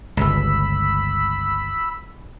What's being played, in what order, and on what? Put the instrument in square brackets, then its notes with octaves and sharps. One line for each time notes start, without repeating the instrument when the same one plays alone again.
[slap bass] G1 C#2 [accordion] B5 E6